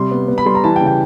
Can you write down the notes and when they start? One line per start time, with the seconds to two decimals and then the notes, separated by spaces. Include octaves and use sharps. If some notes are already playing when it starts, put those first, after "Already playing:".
Already playing: C3 G3 C6
0.11 B3
0.28 B3
0.38 B5
0.46 G3 C6
0.55 A#5
0.64 E3 A5
0.76 G5
0.81 C#3
0.87 G5